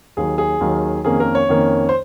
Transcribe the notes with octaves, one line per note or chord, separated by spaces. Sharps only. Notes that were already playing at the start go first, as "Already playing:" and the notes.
D#2 D#3 F#3 G#4
G#4
D#2 D#3 F#3
F2 D#3 A#3 C#4 G#4
A#4
C#5
F2 D#3 A#3 C#4
C5